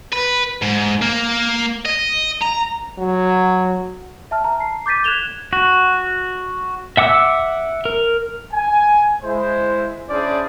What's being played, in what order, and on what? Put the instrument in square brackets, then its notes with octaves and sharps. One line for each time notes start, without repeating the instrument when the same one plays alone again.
[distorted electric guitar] B4
G#2
A#3
D#5
A#5
[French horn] F#3
[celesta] E5 A5 F6
A5 A#5
C7
D6 G6 A6 B6 D#7
F#6 G#6 E7 F7 G7
[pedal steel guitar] F#4
E5 F#5 D6 E6
A#4
[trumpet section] G#5
G#3 E4 C5
C#4 D4 E4 G#4 C5 D5